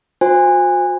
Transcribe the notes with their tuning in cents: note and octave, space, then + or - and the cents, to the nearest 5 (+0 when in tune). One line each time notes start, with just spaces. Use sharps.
F#4 -45 C5 +0 G#5 -25